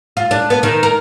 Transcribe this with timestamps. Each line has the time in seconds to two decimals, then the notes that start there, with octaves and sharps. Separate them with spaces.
0.17 F4
0.31 D4
0.50 B3
0.63 D#3
0.83 A#4